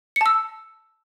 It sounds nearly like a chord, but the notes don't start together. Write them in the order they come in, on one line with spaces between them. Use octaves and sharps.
C#7 A5 E6